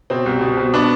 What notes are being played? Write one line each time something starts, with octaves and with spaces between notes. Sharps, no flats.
B2 C4
C2
B2
B2
B3 D4